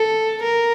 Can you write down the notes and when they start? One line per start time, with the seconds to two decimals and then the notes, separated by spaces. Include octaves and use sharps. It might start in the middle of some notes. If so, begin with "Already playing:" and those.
Already playing: A4
0.43 A#4